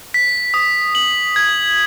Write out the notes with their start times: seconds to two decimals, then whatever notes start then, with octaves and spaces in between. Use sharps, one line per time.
0.14 B6
0.54 D#6
0.95 F#7
1.36 G#6